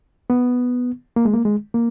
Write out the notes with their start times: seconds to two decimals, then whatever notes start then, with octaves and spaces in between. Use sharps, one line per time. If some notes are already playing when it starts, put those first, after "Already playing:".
0.30 B3
1.16 A#3
1.25 G#3
1.34 A#3
1.45 G#3
1.74 A#3